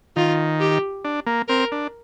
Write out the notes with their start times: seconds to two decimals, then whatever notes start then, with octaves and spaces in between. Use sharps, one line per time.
0.16 D#3 F4
0.60 G4
1.05 D4
1.26 A#3
1.49 C4 A#4
1.72 D4